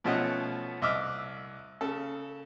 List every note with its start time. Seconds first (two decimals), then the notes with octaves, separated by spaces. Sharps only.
0.04 B2 F3 A3 C#4 D#5 F#5
0.82 C2 D#5 E5 D6 F6
1.81 C#3 A4